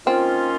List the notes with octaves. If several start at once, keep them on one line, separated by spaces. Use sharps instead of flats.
D#3 A#3 C4 C#4 F4